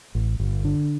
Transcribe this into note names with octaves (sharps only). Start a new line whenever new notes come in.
A1
G1
D3